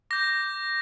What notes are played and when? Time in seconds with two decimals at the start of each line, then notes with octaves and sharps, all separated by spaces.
0.10 D6 G6 A#6